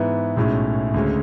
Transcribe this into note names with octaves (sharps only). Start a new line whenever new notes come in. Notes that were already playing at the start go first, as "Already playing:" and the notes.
Already playing: G#2 E3 B3 E4
B1 A2 G#3 C#4 E4
D2 C#3 G#3 C#4